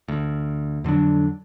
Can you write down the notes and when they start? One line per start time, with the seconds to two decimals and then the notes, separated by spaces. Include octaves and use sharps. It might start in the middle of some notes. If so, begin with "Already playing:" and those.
0.08 D2
0.84 F2 D3 F#3 D4